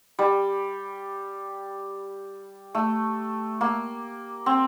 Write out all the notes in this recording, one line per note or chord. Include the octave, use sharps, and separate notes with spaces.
G3
A3
A#3
C4